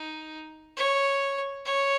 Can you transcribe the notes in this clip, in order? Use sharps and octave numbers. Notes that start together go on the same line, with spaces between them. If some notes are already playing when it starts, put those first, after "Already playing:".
Already playing: D#4
C#5
C#5